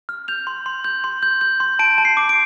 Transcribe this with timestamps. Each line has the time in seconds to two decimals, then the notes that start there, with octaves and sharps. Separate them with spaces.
0.09 F6
0.28 G6 F7
0.47 C6
0.66 C6
0.84 G6
1.04 C6
1.23 G6
1.41 G6
1.60 C6
1.79 A5 D7
1.98 A5
2.05 C7
2.17 D6
2.29 D7